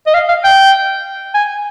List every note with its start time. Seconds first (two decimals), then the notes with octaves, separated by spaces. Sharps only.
0.07 D#5
0.14 F5
0.29 F5
0.44 G5
1.34 G#5